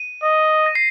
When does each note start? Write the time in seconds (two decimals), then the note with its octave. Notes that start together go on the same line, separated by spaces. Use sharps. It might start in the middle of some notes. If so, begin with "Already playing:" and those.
Already playing: D#7
0.22 D#5
0.66 A#6
0.75 C7